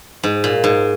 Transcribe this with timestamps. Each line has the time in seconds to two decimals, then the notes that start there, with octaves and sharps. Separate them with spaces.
0.23 G#2
0.44 A#2
0.64 G#2